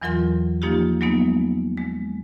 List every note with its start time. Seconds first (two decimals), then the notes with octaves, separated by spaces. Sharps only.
0.01 E2 E3 F#3 F4 A#4 C6
0.62 F3 A#3 D#4 F4 G4
1.01 F#3 G#3 A#3 B3 D#4
1.77 G#3